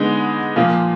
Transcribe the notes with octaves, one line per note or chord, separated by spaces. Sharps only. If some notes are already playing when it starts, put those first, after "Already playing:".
Already playing: D3 G#3 B3 D#4
A#2 F3 A#3 F4